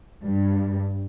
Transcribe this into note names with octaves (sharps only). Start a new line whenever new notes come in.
G2